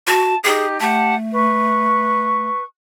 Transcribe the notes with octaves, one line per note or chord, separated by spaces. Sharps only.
F#4 A5
D#4 G4 G#4
A3 G4 F#5 A5
B4 C#6